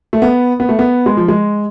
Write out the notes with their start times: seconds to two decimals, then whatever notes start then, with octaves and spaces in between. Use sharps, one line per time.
0.13 A3
0.22 B3
0.60 B3
0.69 A3
0.79 B3
1.06 G#3
1.17 F3
1.28 G#3